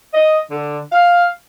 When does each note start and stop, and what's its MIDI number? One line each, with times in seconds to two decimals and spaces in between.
0.14 0.38 75
0.51 0.80 50
0.92 1.26 77